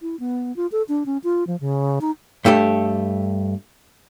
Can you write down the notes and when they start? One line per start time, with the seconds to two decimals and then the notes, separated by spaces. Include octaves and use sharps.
0.01 E4
0.20 B3
0.56 F4
0.72 A4
0.89 D4
1.06 C#4
1.24 F4
1.47 F3
1.60 C#3
2.01 D#4
2.45 G2 A3 G4 A4